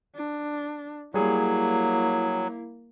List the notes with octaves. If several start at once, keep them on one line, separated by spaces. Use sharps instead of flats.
D4
F#3 G3 A#3 E4 G#4 C#5